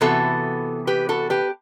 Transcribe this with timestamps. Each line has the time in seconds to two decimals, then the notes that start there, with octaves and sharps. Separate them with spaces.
0.01 C3 E3 B3 F#4 A4
0.87 G4 B4
1.09 F#4 A4
1.30 G4 B4